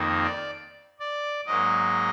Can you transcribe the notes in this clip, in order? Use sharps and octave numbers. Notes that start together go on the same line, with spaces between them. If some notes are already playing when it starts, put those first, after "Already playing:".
Already playing: F2 D#3 A#3
D5
D5
G#2 F#3 A#3 D#5